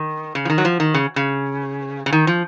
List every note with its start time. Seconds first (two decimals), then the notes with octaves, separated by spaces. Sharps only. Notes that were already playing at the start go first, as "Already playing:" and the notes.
Already playing: D#3
0.35 C#3
0.45 F3
0.50 D#3
0.58 F#3
0.65 F3
0.80 D#3
0.94 C#3
1.16 C#3
2.06 C#3
2.12 D#3
2.27 F3